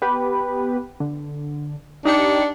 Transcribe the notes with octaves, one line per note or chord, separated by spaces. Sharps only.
B3 G4 B4
D3
D4 D#4 G4 C#7